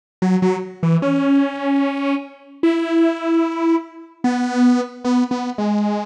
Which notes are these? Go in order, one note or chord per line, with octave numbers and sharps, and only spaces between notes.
F#3
F#3
E3
C#4
E4
B3
B3
B3
G#3